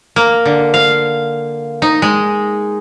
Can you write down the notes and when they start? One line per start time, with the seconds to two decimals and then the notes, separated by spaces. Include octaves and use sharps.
0.16 A#3
0.45 D3
0.74 F5
1.82 D#4
2.02 G#3